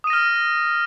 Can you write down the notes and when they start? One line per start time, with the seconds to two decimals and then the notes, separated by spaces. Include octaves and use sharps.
0.04 D#6
0.07 D#7
0.10 A#6
0.13 F6